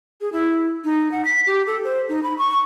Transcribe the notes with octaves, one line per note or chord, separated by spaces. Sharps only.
G#4
E4
D#4
F#5
B6
G4
A4
C5
D#4
B5
C#6